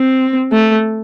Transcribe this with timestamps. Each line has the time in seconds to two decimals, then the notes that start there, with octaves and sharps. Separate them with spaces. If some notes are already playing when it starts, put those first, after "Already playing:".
Already playing: C4
0.52 A3